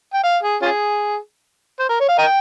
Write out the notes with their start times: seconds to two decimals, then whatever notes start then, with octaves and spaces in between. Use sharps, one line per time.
0.13 G5
0.24 F5
0.43 G#4
0.62 C#4 F4 G#4
1.79 C5
1.89 A#4
2.00 C#5
2.09 F5
2.18 A#4 D#5 G5